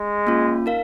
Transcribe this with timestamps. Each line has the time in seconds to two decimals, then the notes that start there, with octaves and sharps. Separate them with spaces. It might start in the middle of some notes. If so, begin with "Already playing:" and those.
Already playing: G#3
0.27 A#3 C#4 F4
0.66 D#4 A#4 F5